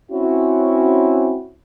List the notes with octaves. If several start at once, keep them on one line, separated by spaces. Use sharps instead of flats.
C4 C#4 E4 F#4